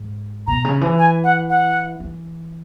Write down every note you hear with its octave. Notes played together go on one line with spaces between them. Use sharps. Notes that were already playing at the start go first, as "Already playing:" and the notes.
Already playing: G#2
B2 A#5
C#3
E3
G#5
F#5
F#5
E3